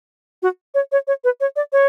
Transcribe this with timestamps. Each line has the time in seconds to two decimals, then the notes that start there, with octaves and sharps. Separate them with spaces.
0.43 F#4
0.74 C#5
0.92 C#5
1.07 C#5
1.24 B4
1.41 C#5
1.56 D5
1.73 C#5